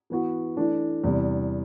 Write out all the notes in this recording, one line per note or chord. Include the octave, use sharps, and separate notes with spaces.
E3 B3 F#4 B4
E3 A3 D4
E2 C3 G3